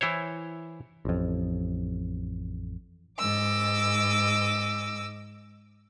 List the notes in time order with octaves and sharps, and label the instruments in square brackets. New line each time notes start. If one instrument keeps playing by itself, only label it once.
[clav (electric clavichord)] E3 E4 C5 C#5
[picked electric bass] A1 F2
[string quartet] G#2 D#5 D6 E6